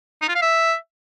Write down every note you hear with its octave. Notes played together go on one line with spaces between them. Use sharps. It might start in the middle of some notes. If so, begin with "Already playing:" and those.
D#4
F4
F5
E5